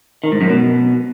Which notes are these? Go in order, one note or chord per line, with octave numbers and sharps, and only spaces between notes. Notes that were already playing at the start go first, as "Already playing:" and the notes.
D#3
G#2
F#2
B2